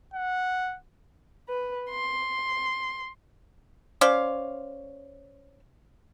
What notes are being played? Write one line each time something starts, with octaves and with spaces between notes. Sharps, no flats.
F#5
B4
C6
C#4 C5 D5 F5